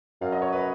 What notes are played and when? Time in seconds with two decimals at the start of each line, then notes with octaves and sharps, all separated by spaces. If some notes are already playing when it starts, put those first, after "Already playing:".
0.21 F#2 F5
0.32 D#5
0.42 C#5
0.52 B4